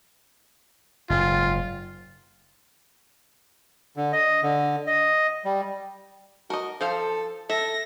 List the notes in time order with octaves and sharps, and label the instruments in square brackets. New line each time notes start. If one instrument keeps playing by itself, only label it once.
[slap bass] F#1 G#2 [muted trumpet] F4
[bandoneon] D3
D#5
D3
D#5
G3
[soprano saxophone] F#4 [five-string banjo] A#4 D#5
[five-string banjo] F3 C5 F5 [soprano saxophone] A4
[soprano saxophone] A4 [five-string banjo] E5 [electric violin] A#6